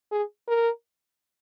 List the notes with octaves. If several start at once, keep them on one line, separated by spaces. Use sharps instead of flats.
G#4
A#4